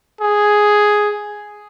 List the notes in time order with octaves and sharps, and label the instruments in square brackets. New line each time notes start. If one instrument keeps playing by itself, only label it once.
[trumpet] G#4